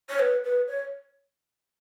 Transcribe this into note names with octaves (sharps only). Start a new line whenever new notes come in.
C#5
B4
B4
C#5